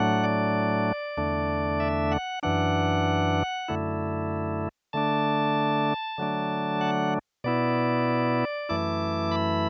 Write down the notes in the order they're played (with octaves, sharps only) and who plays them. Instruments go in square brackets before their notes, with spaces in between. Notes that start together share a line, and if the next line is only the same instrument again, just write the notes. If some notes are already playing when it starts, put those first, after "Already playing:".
Already playing: [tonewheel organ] A2 F#3 A3 D4 F#5
D5
E2 D3 A3 D4
E5
F#5
F#2 E3 D4 F#5
F#2 D3 A3 E4
D3 A3 D4 A5
D3 F#3 A3 D4
F#5
B2 B3 E4 D5
F#2 E3 A3 E4 D6
B5